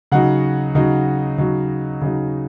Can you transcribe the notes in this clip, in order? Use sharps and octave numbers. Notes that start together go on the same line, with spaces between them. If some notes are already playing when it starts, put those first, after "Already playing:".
C#3 F#3 D#4 F#5
C#3 F#3 D#4
C#3 F#3 D#4
C#3 F#3 D#4